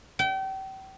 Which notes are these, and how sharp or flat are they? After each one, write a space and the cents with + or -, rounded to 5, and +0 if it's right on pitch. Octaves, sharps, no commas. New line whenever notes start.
G5 -35